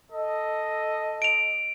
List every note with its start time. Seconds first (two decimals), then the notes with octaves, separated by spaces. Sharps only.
0.11 A4 D#5
1.22 D7 F7